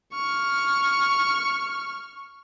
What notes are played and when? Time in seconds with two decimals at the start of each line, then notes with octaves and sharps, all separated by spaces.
0.14 C#6 F6